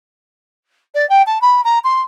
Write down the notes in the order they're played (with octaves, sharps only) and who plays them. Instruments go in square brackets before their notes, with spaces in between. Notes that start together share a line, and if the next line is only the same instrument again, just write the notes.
[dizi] D5
G5
A5
B5
A#5
C6